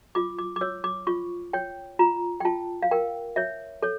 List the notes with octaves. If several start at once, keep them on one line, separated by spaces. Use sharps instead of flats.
F4 D6
D6
D6
C#5 E6
D6
F4 C#6
C#5 G5
F4 A#5
G5
F4 A5
F5
A#4 G5
C#5 E5
A4 C#5